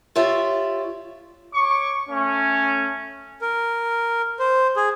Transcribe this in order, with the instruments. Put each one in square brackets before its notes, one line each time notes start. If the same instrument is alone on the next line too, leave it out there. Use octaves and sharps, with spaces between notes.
[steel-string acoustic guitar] F4 G4 C#5 D5 E5
[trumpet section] C#5 C#6 D6
A3 C#4
[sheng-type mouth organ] A#4
C5
G#4